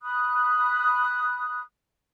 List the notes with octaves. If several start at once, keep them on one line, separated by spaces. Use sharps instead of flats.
B5 D#6 F#6